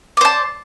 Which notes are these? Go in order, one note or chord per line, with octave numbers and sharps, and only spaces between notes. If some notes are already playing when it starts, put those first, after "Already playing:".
C5 D5 A5